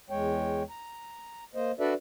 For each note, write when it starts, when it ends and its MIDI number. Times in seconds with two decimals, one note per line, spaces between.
0.10 0.63 40
0.10 0.63 56
0.10 0.63 73
0.10 0.63 79
0.70 1.44 82
1.55 1.71 58
1.55 1.71 72
1.55 1.71 75
1.80 1.94 62
1.80 1.94 66
1.80 1.94 69
1.80 1.94 71
1.80 1.94 74
1.80 1.94 76